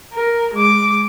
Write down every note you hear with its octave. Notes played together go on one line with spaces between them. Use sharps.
A#4
G#3 D6